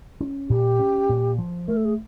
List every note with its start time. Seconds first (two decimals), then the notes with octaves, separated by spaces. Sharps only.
0.20 C#4
0.49 A#2 G4
0.79 C#4
1.09 A#2
1.38 F3
1.68 A3 A#4
1.77 A4
1.85 G#4